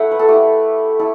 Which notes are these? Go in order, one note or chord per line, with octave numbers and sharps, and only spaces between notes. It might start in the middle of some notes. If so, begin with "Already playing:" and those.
Already playing: A3 E4 E5 F#5
B4
A4
A3 E4 G4
E4 A4